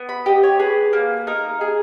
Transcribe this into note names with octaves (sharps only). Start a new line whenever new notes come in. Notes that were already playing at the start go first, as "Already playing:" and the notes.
Already playing: B3
B5
G4 D#5
C#5
G#4 B4
A#3
D#4 A#4
G#4